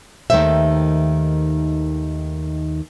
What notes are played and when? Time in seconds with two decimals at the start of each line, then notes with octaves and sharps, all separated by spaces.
0.30 D#2 D#3 F3 A3 C5 E5